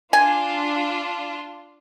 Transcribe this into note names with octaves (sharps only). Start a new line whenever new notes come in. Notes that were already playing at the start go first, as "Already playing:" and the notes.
D4 F4 G#5